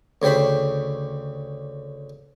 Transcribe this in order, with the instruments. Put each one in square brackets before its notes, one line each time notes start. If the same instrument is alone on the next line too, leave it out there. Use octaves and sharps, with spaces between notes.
[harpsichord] D2 C#3 G4 C5 B5